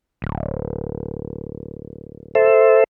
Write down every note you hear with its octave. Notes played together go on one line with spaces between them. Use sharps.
D1
A4 C5 E5